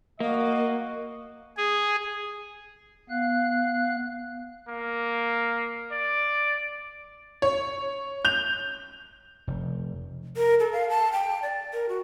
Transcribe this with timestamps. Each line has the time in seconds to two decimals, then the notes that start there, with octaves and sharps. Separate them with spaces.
0.20 A#3 F#4 D#5 F5
1.57 G#4
3.09 B3 F5 F#6
4.68 A#3
5.92 D5
7.42 C#5
8.25 G6 F7
9.47 F1
10.37 A#4
10.60 A4
10.73 F5
10.89 A5
11.12 G5
11.43 D5
11.73 A#4
11.89 F#4